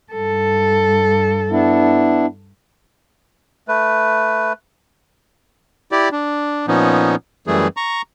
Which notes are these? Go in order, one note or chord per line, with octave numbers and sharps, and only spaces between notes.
G2 A4
B3 D4 E4
A3 B4
E4 G4 D5
D4
A#2 F3 B3 C#4 D#4
F#2 E3 G3 A3 G#4
A#5 C#6